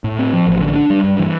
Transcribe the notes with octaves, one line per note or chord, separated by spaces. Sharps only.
A2
C4
F3
A1
D3
D4
G3
G2
E3